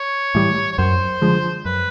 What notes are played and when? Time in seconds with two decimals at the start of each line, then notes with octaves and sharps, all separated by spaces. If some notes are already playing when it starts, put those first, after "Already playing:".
Already playing: C#5
0.35 A2 E3 G3
0.72 C#5
0.78 F#2 C5
1.22 D3 F3 G#3
1.65 F#2 B4